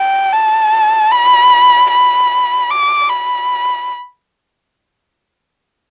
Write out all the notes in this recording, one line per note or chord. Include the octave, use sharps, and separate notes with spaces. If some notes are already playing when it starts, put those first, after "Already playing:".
Already playing: G5
A5
B5
B5
D6
B5